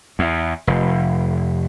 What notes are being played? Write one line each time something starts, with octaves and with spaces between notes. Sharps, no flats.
E2
F1